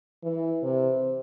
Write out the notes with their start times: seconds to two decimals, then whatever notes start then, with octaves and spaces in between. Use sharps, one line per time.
0.23 E3
0.63 C3